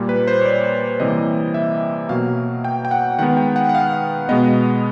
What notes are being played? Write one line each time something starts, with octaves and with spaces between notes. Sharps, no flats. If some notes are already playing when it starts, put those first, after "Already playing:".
Already playing: A#2 G3 A#3
B4
C5
C#5
D5
C3 E3 G3 A#3 D#5
E5
B2 F#3 A#3 F5
G5
G5
F#5
D#3 G#3 B3 F#5
G5
F#5
F#5
F5
B2 G#3 B3 D#5